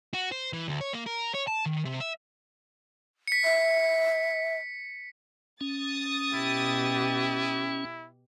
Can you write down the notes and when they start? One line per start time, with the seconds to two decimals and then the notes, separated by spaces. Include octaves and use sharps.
0.14 F#4
0.32 C5
0.53 E3
0.68 D2
0.81 C#5
0.93 A#3
1.06 A#4
1.34 C#5
1.47 A5
1.65 D#3
1.85 C3
2.00 E5
3.27 B6 C#7
3.44 E5
5.61 C#4 D#6 A6
6.34 B2 E4 G4